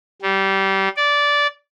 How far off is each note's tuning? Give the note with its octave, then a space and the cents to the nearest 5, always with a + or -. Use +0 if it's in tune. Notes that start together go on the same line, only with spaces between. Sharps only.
G3 -20
D5 -15